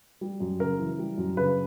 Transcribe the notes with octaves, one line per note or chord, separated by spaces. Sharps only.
G3
F#2
C#3 A#4
E3
G3
F#2
C#3 B4